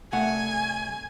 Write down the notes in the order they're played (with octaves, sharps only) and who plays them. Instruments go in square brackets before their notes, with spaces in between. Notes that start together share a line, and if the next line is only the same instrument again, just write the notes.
[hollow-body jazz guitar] C2 A3 F#5 [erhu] G#5